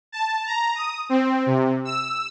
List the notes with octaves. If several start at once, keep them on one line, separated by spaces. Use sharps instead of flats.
A5
A#5
D#6
C4
C3
E6